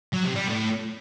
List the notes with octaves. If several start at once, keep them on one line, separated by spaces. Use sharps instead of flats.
F#3
C3
G3
A2